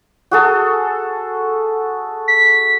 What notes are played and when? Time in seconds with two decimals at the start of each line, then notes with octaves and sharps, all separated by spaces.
0.31 F#4 G#4 A4
2.28 B6